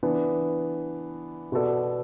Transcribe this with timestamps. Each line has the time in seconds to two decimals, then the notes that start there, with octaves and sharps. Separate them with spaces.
0.03 E3 B3 D4
1.52 B2 B3 F#4 A4 D5